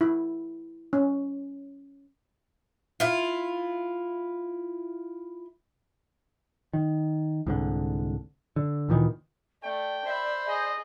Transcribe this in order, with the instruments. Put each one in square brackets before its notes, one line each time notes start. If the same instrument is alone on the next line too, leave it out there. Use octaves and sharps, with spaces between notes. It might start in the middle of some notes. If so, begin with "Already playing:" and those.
[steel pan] E4
C#4
[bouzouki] E4 F4
[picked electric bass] D#3
C2 G#2 D3
D3
D2 A#2 D#3 E3
[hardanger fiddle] A3 [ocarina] D5 [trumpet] G5
[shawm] C5 [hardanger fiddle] E5 B5
[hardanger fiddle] G#4 [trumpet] D#5